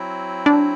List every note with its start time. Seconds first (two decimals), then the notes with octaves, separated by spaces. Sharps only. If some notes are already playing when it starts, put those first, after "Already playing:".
Already playing: F#3 C4 E4
0.46 D4